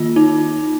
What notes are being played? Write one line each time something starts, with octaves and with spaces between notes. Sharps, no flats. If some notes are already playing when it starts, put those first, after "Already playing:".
Already playing: D#3 A#3 F4
D#4